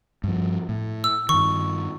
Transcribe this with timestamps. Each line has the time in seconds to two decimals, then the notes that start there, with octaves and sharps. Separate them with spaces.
0.24 G2 F3
0.69 A2
1.04 E6
1.29 G2 D#3 C#6